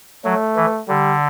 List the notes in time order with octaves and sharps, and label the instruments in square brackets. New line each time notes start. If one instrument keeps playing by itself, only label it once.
[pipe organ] F#3 [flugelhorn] A3
[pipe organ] E3
[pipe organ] D3 [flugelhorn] G3